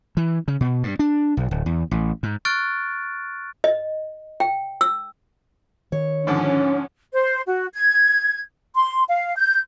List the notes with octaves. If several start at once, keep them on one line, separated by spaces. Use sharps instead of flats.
E3
C#3
B2
G2
D4
B1
D1
E2
A1
G#2
C#6 F6 F#6 A6 D7
D#5
G5
E6
D#3 C#5
G#2 D3 F3 C#4
C5
F#4
G#6
C6
F5
G6